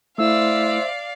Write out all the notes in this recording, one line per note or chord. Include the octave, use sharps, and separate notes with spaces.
A3 E4 C5 D5 E5 F5 E6